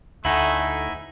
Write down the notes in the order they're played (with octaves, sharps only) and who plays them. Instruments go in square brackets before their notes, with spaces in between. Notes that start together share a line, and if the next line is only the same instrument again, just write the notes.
[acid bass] D2 [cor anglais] A3 [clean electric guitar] D#4 E4 [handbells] E5 F#5 G#5